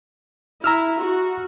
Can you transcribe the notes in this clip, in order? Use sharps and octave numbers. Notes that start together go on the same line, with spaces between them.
E4 A#5 E6 F6
F#4